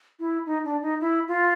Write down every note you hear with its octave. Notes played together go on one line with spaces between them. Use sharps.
E4
D#4
D4
D#4
E4
F4